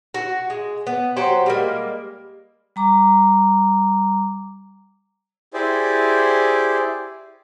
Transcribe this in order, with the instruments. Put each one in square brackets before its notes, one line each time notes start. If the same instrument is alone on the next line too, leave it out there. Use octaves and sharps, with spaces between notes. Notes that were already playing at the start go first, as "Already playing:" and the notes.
[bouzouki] F#4
G#3
B3
F#3 G4 C5 F#5
G3 G#3 A#3
[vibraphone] G3 A#5 D6
[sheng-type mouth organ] E4 G4 G#4 C5 D5